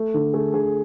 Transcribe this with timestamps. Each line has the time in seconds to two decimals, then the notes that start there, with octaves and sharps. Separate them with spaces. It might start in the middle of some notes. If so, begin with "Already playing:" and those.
Already playing: A3
0.14 D3
0.34 A3 G#4
0.54 D3 G#4